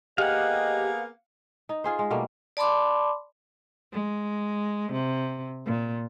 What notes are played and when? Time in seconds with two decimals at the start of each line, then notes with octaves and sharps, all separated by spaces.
0.18 A#3 B3 G4 G#4 D#5 F5 F#5
1.69 D#4
1.84 F4 G#4 C5
1.99 G#3
2.10 B2 G3 A3 A#3
2.57 D5 A5 B5 C6 D6
3.93 G#3
4.93 C3
5.66 A#2